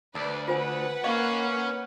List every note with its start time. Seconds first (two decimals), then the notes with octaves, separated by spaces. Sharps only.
0.15 D2 B4 D5 A5
0.48 F4 B4 C5 F#5 G#5
1.04 A#3 C#4 C#5 D#5 F5